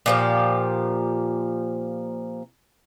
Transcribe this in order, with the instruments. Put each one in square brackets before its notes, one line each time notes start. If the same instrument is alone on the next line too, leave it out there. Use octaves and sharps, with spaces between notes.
[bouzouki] A#2 F3 G4